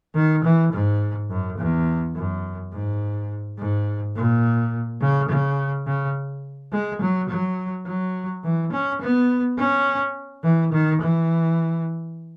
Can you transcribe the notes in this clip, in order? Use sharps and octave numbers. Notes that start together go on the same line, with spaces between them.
D#3
E3
G#2
F#2
E2
F#2
G#2
G#2
A#2
C#3
C#3
C#3
G#3
F#3
F#3
F#3
E3
C#4
B3
C#4
E3
D#3
E3